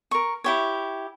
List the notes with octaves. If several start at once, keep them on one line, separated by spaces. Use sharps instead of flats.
A#4 C#6
E4 G4 C#5